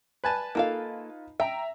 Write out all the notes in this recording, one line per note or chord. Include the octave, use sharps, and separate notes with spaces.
B4 G#5 A5
A#3 D#4 F4 A4 F5
E5 G5 A#5